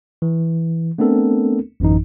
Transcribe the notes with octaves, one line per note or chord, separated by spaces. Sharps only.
E3
A3 B3 C4 D4 A4 A#4
A1 F#2 E3 D#4